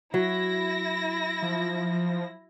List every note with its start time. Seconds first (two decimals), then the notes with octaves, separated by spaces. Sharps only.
0.14 F#3 E4 A#6
1.42 F3